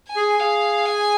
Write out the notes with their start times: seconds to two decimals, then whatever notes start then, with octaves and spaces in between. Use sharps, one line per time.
0.08 G#5
0.16 G#4
0.39 G#4 F5
0.86 G#5